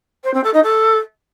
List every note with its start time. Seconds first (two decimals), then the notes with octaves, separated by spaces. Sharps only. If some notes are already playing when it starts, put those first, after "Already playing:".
0.24 C5
0.34 C4
0.44 A4
0.54 D#4
0.64 A4